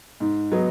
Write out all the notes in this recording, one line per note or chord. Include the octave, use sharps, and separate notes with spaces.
G#2
F#3 B3 D#4